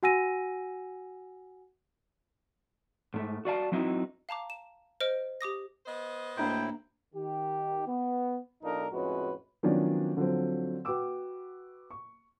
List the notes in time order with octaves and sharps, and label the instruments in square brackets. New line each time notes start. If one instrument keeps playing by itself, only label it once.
[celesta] F#4 F#5 G#5 E6 A#6 D#7
[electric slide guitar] G#2 A3
F#4 D5 F5 A5
F#3 C4 D#4 E4 F#4
[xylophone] F5 A5 A#5 D6
E7
C5 D#5 F6 D7
G4 D6 D#6 A#6
[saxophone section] B3 C5 D#5
[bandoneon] D2 A2 E4 [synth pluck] A#3 D4 A#5 [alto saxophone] G5
[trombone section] D#3 G4
B3
B1 D4 D#4 F4 A4 A#4
F2 A2 G#3 C#4 F#4 B4
[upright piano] D#3 F3 F#3 B3 C#4 D4
D3 F3 F#3 C4
F#4 B4 G5 D6 E6
C#6